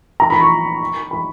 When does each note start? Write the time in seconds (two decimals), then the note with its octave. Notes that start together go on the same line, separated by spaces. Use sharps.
0.20 A#5
0.30 B5
0.41 C#6
1.11 B5